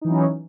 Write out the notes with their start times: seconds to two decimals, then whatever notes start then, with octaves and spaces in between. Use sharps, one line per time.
0.01 D#4
0.05 E3
0.08 F#3
0.11 C#4